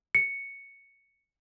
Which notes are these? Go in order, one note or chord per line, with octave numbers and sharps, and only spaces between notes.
C#7